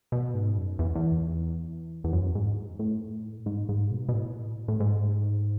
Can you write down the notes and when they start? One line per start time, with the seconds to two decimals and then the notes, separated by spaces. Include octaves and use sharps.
0.12 B2
0.34 G#2
0.57 F#2
0.79 E2
0.95 E2
2.04 E2
2.13 F#2
2.35 G#2
2.79 A2
3.46 G#2
3.69 G#2
3.91 B2
4.09 B2
4.13 A2
4.68 A2
4.80 G#2